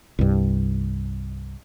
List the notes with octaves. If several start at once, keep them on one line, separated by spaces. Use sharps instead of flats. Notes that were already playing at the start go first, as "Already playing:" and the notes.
C2 G2